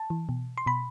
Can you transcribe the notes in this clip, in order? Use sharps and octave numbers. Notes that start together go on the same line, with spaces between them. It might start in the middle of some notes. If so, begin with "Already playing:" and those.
Already playing: A5
E3
B2
C6
B2 B5